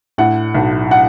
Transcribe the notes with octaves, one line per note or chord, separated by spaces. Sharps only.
A2 F#5
B1
F#5